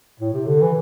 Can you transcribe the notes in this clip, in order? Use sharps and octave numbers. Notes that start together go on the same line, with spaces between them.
A2
C3
D3
E3